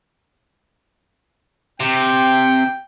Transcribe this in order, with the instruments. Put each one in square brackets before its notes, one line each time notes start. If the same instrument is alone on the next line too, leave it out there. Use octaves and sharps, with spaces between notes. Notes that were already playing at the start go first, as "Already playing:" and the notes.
[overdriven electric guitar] C3 [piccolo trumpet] G5